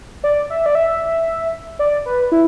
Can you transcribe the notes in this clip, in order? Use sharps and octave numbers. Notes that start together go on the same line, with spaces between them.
D5
E5
D5
E5
D5
B4
E4